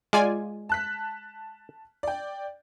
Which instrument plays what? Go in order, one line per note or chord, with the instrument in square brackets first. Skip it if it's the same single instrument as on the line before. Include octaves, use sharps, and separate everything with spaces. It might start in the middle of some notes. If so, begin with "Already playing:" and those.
[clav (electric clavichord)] G#3 [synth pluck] F4 D5 G#5
[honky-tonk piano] A5 F#6 B6
D5 G5